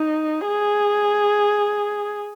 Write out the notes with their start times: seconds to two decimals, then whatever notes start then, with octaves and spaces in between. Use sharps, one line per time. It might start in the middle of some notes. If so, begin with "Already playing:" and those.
Already playing: D#4
0.47 G#4